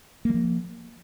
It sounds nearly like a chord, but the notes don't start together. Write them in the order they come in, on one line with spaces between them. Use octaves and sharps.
A#3 F#3 F3